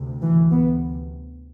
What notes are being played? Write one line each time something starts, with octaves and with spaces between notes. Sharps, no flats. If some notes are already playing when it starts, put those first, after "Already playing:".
Already playing: D2 C3
E3
B3